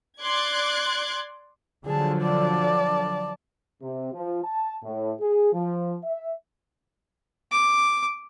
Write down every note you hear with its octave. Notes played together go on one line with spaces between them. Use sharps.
D5 C6 D6 F#6 G#6
D3 F3 F#3 G#4 A5
D5 A5
C3
F3
A5
A2
G#4
F3
E5
D6